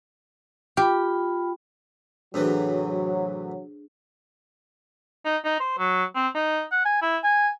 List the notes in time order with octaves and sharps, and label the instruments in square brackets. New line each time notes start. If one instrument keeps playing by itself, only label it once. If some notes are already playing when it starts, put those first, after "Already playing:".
[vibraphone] F4 G5 B5 [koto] G4
[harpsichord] A2 C3 E3 [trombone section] F#3 [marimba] D4 G#4
[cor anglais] D#4
D#4
C5
F#3
C4
D#4
F#5
G#5
E4
G#5